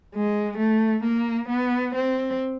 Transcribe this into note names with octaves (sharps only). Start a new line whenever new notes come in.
G#3
A3
A#3
B3
C4